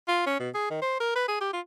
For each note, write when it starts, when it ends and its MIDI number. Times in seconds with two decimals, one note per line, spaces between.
0.08 0.22 65
0.26 0.38 61
0.40 0.49 47
0.55 0.68 68
0.70 0.81 51
0.82 0.97 72
1.00 1.14 70
1.16 1.27 71
1.28 1.40 68
1.41 1.53 67
1.53 1.60 65